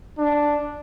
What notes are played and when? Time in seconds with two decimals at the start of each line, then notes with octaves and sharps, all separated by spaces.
0.18 D4